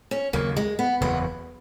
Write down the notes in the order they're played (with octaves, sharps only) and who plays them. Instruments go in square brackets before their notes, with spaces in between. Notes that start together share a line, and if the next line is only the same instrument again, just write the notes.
[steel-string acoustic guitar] C#4
[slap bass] D#2 C#3 F#3 [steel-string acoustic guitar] A#3
[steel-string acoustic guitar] G#3
B3
[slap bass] F#1 E2 C#3 F#3 [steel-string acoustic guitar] B3